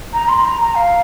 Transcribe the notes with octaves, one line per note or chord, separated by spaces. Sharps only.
A#5
C6
A#5
A#5
F5